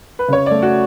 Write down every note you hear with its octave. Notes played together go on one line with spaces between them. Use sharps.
B4
C#3 C#5
A3 D5
F#4